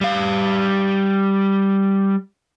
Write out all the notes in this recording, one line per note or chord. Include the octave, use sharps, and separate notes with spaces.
G3 F5